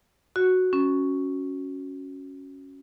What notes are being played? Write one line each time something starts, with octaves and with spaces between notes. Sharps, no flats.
F#4
C#4